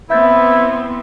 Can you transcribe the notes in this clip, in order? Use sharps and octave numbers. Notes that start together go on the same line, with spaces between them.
B3 C4 E4 E5 G6 A6